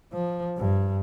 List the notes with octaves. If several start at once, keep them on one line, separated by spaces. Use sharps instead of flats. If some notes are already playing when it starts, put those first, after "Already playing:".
F3
G2